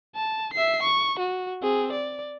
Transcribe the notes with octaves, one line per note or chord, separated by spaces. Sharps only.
A5
E5 C7
C#6
F#4
C4 G#4
D5